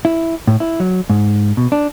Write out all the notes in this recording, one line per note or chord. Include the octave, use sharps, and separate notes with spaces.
E4
A2
E4
F#3
G#2
B2
D4